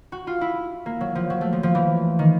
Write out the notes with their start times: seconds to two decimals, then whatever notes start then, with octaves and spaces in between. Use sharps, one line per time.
0.12 F#4
0.27 F4
0.41 E4
0.86 A#3
1.01 F#3
1.15 F3
1.30 F#3
1.41 A3
1.53 F3
1.63 F3
1.75 E3
2.19 D#3